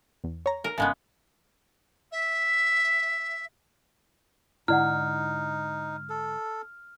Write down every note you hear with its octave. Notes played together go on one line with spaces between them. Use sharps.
E2
C#5 A#5
A#4
G#1 C#3 G#3 B3 A5
E5
G#2 D3 D#4 E4 D5 F#5 F6
A4